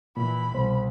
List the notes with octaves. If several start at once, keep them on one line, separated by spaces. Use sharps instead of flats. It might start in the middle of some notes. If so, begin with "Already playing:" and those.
A#2 E3 B5
C2 B2 C5